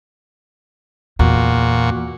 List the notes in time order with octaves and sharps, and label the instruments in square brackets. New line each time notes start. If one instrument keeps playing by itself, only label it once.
[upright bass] E2 [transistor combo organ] A#2 F#4